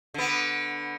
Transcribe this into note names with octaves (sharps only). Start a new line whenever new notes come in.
D3 B3